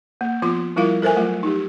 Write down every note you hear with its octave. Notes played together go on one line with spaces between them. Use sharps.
A#3
F3 B3 F4 C6
F3 G3 E4 F4 A#4 F5
A4 A#4 C5 E5 G#5
F#3 A3 F4
D#4 G4